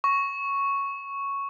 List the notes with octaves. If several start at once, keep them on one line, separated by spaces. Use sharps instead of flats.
C#6